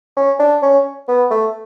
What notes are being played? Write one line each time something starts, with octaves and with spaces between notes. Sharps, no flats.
C#4
D4
C#4
B3
A3